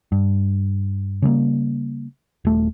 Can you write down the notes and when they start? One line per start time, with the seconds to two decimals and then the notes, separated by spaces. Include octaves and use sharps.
0.12 G2
1.22 C#3 G3 A3 A#3
2.45 D#1 A3